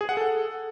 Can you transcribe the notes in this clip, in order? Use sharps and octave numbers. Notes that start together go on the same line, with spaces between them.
G#4
F#5
A4